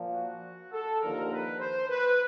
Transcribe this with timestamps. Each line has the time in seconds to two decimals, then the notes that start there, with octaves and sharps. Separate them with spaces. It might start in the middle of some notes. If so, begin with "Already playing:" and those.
Already playing: A#2 F3
0.14 F#4
0.72 A4
1.00 D#2 D3 F3 A#4
1.31 B4
1.59 C5
1.89 B4